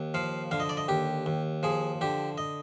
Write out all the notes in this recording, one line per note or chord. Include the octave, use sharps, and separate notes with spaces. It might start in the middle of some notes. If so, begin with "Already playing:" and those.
Already playing: D#2
F3 F5
D3 F5
D#5
D5
D#5
D#2 G4
D#2
F3 G#4
D3 G4
D#5